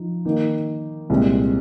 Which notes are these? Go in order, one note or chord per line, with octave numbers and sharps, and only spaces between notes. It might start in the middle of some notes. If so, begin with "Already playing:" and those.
Already playing: F3 D#4
D#3 A#3 D#4
C2 A#2 G#3 C4